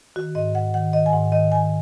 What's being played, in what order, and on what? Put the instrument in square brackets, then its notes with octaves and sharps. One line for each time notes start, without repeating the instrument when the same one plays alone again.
[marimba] D#3 F#4
G#2 D#5
G#2 F#5
D#3 F#5
D#3 D#5
G#5
G#2 F#5
D#3 D#5
D#3 G#5